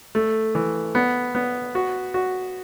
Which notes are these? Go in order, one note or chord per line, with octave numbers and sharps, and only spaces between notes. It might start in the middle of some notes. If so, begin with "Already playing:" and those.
A3
E3
B3
B3
F#4
F#4